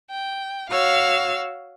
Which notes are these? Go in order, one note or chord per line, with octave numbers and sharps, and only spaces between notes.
G5
F#4 C#5 F5 E6